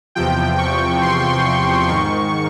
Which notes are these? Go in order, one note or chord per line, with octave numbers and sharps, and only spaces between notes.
E2 C3 F3 G5
C#6
C6
G#2 D#3 C#6